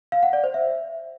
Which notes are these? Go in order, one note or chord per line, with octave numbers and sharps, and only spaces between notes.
F5
F#5
D5
C5
E5